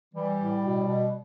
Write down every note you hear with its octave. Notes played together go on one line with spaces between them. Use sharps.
E3 G3
A2
B2
B2